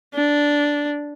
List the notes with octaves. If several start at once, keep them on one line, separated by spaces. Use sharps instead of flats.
D4